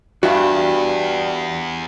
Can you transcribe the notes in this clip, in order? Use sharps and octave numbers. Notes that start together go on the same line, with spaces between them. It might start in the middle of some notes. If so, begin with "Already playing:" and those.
E2 G2 F#4 E5 F5